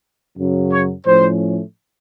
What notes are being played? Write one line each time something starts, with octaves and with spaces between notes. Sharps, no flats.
F#2 C#3 F#3
C#5
A2 F3 A3 C#4 C5